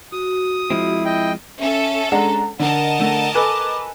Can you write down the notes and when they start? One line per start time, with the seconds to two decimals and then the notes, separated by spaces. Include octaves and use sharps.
0.12 F#4 D#6
0.70 F3 G#3 C4 E4
1.05 D#5 G5
1.60 C#4 A4 E5
2.12 G#3 D4 F#5 A#5
2.59 D3 A#4 D#5 F#5 A5
3.00 D3 A3
3.34 A4 B4 G#5 D6